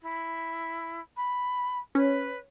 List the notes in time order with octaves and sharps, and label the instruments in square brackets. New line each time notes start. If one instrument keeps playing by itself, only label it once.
[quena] E4
B5
[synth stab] C#4 [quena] B4